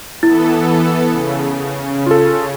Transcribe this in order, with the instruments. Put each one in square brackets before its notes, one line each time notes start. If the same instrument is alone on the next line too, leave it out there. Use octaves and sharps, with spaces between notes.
[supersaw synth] E3 B3 A4 [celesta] E4
[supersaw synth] C#3
[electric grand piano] F4 A4